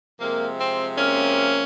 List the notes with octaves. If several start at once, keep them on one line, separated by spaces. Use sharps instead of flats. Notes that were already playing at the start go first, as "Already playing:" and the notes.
C3 F3 G#3 A#3
C4
A#3 C#4